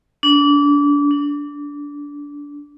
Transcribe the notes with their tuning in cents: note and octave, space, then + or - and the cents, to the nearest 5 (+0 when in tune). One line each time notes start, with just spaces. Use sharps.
D4 -30
D4 -20